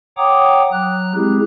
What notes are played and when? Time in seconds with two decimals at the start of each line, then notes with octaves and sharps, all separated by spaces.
0.17 C#5 F#5 G5 A#5 D6 D#6
0.72 F#3 A#5 F#6
1.15 G#3 C4 E4 G4 G#4